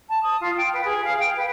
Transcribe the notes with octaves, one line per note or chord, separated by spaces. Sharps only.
A5
D#6
F4
G5
B4
G#4
F5
G5
B4